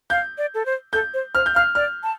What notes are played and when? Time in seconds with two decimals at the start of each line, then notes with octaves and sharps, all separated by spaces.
0.10 F5 G6
0.38 D5
0.54 A4
0.66 C5
0.93 A4 G6
1.14 C5
1.35 C5 F6
1.46 G6
1.55 F5 F6
1.75 D5 F6
2.03 A5